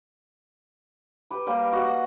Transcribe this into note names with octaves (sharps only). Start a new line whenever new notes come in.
G4 B4
G3 A#3 G5
F#4 D#5
F#5